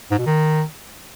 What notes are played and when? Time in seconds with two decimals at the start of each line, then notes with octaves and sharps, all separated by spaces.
0.11 G#2
0.19 B2
0.26 D#3